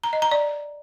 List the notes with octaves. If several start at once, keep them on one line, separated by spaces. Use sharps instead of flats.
A#5
D#5
A#5
D5